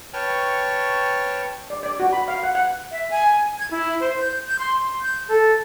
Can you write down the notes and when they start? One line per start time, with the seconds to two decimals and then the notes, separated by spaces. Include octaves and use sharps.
0.14 B4 C#5 G5 A5 C#6 F6
1.70 D5
1.83 D5
2.00 F#4
2.13 B5
2.28 F5
2.43 F#5
2.55 F#5
2.92 E5
3.11 G#5
3.59 G#6
3.71 E4
4.00 C5
4.18 G6
4.46 G6
4.59 C6
5.01 G6
5.29 A4